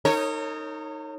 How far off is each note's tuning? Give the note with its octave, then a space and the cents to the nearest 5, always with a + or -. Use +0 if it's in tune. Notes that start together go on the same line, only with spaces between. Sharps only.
D#4 +0 A#4 -40 C#5 -15